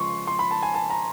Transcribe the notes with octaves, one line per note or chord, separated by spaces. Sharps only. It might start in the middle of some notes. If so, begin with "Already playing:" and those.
Already playing: C#3 F3 G#3 C6 C#6
C6
B5
A5
G#5
A5
A#5